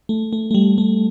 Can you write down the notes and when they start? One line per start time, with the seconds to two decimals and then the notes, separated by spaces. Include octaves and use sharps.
0.09 A3
0.33 A3
0.51 A3
0.55 G3
0.78 A3